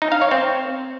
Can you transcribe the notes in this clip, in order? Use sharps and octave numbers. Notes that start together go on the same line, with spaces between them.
D#4
F5
C#5
C4